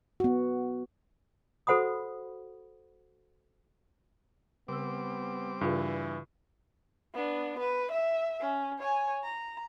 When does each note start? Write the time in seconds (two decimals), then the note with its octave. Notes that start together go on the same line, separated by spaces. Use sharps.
0.20 B3 F#4
1.67 F#4 A4 C5 F#5 B5 D#6
4.68 C#3 G3 B3 C4 D6 E6
5.61 G2 C#3 E3 F4 G#4
7.14 B3 D4
7.59 B4
7.91 E5
8.40 C#4
8.79 C#5 G#5
9.24 A#5